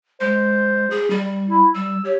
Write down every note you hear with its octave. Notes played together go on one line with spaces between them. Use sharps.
G#3 C5
G#4
G3
E4
G3 E6
G4 C#5